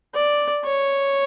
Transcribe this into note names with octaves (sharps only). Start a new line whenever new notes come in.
D5
C#5